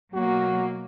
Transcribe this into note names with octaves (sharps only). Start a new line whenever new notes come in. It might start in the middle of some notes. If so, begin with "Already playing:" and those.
B2 F#3 A#3 F#4